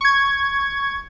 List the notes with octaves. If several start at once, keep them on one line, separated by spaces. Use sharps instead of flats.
C#6 G#6